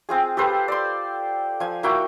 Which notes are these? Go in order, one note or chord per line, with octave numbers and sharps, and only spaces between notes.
C4 F4 G#4
G4 A4 B4 C5
D5 C6
F3 G#5
A#3 E4 F#4 G5